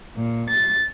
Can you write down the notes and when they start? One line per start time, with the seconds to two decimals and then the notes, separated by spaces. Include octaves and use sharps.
0.14 A#2
0.50 A6